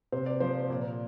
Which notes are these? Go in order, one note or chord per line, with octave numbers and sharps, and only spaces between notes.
C3 C5
D5
F3 C5
A#2